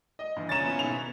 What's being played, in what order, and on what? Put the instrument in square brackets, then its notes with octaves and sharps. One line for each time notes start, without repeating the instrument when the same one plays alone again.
[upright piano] D#5
[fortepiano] G2 E3
[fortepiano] C#2 A#5 [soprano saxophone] C#4 [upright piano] A6 E7
[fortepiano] F3 B3 E4
[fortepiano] B1 G#2 B2 [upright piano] F7
[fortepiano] B3